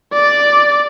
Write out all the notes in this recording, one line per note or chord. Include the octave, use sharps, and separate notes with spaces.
D5